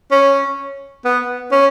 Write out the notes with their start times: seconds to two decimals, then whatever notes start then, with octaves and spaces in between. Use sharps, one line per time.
0.11 C#4
1.05 B3
1.52 C#4